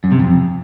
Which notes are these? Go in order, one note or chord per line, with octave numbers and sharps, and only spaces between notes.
F#2
C3
F2